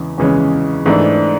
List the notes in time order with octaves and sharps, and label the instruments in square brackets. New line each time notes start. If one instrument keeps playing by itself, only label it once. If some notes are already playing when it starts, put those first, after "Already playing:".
Already playing: [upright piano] E2 C#3 E3 G#3 C#4
E2 C#3 E3 G#3 C#4
G#2 E3 A3 D4